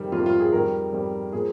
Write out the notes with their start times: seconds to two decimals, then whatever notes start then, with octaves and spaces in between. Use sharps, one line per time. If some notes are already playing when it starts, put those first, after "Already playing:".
Already playing: F2 C3 D#3 G3
0.12 F2 C3 D#3 G3 F4
0.26 F4
0.39 G#4
0.53 F2 D#3 G3 A#4
0.93 F2 D#3 G3
1.32 A#2 F3 G#4